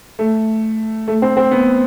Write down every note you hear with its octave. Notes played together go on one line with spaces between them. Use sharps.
A3
A3
C4
C4
B3